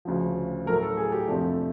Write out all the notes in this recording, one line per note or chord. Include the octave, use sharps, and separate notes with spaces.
D2 C#3 F3
A2 F#3 A3 A#4
A4
G#4
G4
F2 C3 F3 A3 D4